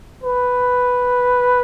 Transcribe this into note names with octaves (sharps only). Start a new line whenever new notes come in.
B4